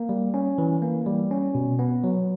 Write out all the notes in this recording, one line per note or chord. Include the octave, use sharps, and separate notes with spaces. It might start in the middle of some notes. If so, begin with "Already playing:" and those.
Already playing: A#3
G3
C#4
E3
A#3
G3
C#4
B2
B3
F#3